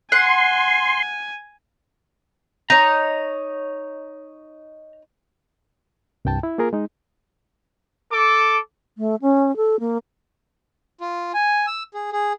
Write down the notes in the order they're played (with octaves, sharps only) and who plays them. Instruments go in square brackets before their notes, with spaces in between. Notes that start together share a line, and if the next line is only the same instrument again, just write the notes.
[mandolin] F#5 [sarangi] G#5 [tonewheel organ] C6
[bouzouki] D#4 C#5 [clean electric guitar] A#5
[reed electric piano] C2 G2 G5 A5
E4
A#3 F4 G#4 A#4
G#3 D#4
[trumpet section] A4 D6
[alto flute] A3
C#4
A4
A#3
[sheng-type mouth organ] F4
G#5
E6
G#4
G#4